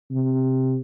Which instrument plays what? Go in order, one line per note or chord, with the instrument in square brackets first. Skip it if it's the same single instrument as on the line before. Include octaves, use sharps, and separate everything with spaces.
[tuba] C3